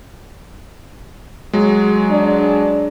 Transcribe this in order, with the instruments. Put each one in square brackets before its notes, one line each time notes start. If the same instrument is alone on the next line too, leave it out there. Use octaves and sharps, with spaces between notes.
[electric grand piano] F#3 G#3
[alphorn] D4